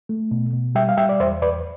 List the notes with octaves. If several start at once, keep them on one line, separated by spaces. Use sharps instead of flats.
A3
B2
B2
G3 E5 G5
F5
G3 E5 G5
D5
E2 C5 E5
E2 B4 D5